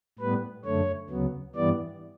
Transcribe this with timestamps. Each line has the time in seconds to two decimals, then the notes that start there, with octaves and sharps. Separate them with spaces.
0.19 A2 G3 B3 B4
0.64 F#2 D3 A3 C#5
1.10 D2 C#3 F#3 B3
1.55 G2 E3 G3 B3 D5